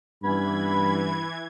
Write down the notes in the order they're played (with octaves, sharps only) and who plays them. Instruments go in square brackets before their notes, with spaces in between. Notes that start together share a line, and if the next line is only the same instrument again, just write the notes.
[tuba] G2 [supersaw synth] E3 G#6 [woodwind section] B3 C#4 B5